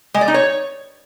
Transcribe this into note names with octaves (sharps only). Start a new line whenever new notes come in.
G#3
D5
D#4
C#5